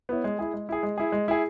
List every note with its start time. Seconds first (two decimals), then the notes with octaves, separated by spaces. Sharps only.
0.09 B3 E4 C#5
0.24 G#3
0.39 E4 G#4
0.54 G#3
0.69 E4 G#4
0.83 G#3
0.98 E4 G#4
1.12 G#3
1.28 E4 G#4